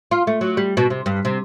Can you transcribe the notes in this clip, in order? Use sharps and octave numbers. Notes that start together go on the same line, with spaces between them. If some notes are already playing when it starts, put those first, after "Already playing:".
F4
A3
F#3
G3
B2
C3
G2
C3